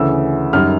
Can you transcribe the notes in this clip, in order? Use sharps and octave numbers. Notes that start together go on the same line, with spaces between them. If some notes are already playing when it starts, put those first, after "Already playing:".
Already playing: D2 C#3 E3 E6
F#2 D#3 G3 F6